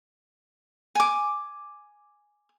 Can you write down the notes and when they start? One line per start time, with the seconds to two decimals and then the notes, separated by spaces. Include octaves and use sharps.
0.95 G#5 D6